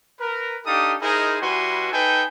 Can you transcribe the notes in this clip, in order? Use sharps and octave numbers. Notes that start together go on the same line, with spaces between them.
A#4 B4
D4 D#4 G4 A4 F5 D#6
D#4 E4 G#4 A#4 C5 D#5
G3 E4 F#4 B4 G#5 C6
D#4 A4 B4 G5 G#5